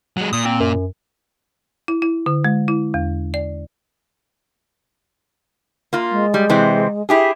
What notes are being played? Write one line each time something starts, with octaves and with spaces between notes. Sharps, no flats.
F#3 G#3
A#2 D#6
C4
F#2
E4
E4
D3
G#3
E4
E2
D5
A#3 F4
G#3
G3
C3 E3 C4
E4 G4 G#4